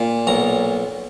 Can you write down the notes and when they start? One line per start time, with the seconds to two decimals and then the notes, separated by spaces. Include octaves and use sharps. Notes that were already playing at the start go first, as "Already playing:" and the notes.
Already playing: A#2
0.27 B1 A#5